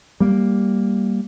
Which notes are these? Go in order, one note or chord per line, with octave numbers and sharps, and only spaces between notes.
G3 A#3